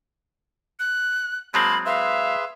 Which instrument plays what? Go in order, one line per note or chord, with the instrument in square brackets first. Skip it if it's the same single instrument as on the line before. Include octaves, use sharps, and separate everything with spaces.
[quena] F#6
[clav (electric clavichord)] F#3 G#3 C4 [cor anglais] A#3 [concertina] A5 C6 [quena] B5
[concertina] G#4 B4 C6 [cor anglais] E5 [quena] F5